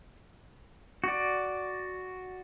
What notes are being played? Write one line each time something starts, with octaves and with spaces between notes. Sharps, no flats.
F#4 D5